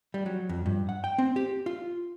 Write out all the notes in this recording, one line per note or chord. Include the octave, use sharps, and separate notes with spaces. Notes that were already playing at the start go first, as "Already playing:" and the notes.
G3
F#3
F2
G2
F#5
G5
C4
G4
F4